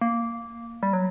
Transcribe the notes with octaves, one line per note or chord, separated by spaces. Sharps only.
A#3
G3
F#3